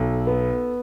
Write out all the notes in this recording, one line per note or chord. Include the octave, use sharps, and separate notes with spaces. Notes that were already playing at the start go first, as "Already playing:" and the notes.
Already playing: B1 A4
B3